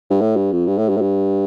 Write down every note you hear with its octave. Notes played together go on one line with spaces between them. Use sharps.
G2
A2
G2
F2
G2
A2
G2
A2
G2